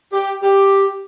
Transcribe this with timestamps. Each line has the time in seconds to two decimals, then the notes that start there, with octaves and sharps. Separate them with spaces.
0.13 G4
0.43 G4